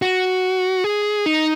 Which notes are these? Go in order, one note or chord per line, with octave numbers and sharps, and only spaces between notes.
F#4
G#4
D#4